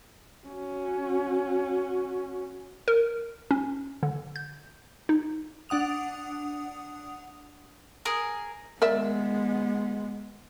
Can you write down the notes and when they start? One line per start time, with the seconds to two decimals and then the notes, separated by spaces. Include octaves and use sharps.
0.47 C#4 F#4
2.88 A#4
3.51 C#4
4.03 D3
4.36 G6
5.09 D#4
5.69 D4 F#5 D#6 F7
8.05 G#4 A#4 D#6
8.82 G#3 B3 A#4 D5 E5